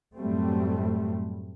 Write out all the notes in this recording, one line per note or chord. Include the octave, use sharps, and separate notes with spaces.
F#2 A2 F#3 G3 A3 C4